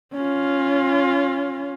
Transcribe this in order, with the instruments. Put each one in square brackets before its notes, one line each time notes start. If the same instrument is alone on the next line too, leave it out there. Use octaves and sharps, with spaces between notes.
[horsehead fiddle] C#4 F4